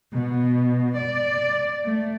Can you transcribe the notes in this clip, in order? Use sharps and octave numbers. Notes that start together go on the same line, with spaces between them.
B2
D5
A3